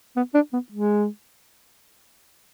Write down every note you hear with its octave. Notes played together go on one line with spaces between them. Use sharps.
B3
D4
B3
G#3